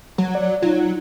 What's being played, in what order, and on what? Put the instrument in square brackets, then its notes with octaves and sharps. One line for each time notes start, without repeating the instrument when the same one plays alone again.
[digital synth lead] F#3
[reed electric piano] D5
[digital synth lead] F#3 [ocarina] D#4 [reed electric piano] F4